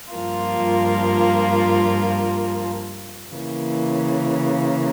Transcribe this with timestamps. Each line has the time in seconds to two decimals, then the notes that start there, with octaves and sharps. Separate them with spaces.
0.14 G2 F3 A#3 F4
3.34 C#3 E3 A#3